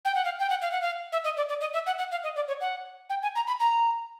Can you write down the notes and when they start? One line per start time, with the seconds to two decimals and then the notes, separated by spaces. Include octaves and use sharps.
0.05 G5
0.15 F#5
0.25 F5
0.39 G5
0.50 F#5
0.62 F5
0.72 F#5
0.82 F5
1.12 E5
1.24 D#5
1.37 D5
1.49 D5
1.61 D#5
1.74 E5
1.86 F#5
1.98 F#5
2.11 F5
2.24 D#5
2.36 D5
2.48 C#5
2.60 F#5
3.10 G5
3.22 G#5
3.35 A#5
3.47 B5
3.60 A#5